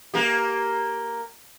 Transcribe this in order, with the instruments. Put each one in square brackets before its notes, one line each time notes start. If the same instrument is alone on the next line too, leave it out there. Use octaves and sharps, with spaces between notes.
[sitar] A#3 G4